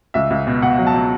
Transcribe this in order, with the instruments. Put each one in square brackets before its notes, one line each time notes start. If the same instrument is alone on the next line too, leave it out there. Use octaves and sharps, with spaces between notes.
[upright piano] C#2 E5
C#2
B2
B2 F#5
F#3
A5
F#3